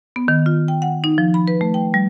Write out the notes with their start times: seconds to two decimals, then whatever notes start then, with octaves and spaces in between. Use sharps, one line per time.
0.16 B3
0.28 D#3
0.46 F4
0.68 G5
0.82 F#5
1.04 D#4
1.18 F3
1.34 B5
1.48 B4
1.61 A3
1.74 G5
1.94 G3